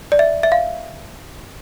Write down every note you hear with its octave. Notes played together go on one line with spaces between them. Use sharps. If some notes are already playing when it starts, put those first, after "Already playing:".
D5
E5
E5
F5